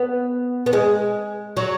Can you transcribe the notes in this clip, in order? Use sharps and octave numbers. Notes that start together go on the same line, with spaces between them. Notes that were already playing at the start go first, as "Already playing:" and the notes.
Already playing: B3
B3
G#3
F#3